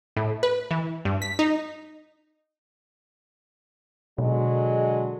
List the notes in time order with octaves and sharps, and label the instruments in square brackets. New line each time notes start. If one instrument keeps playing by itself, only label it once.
[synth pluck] A2
B4
E3
G2
B6
D#4
[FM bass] B2 [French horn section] D3 F#3 G#3